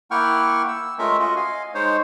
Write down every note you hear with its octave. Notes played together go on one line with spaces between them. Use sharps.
A#3 E4 F#5 G5 C#6 F6
E6
G#3 A3 C#4 F4 A#4 E5
F4 F#4 D#5
D#5 F5 G#5
G#3 D#4 C5 C#5